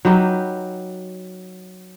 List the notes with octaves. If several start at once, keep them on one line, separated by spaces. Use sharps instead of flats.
F#3 D#4 G4 B4